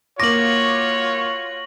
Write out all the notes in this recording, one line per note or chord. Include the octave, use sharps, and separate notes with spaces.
A#3 F4 F#4 C#5 C#6 D6 A#6 F#7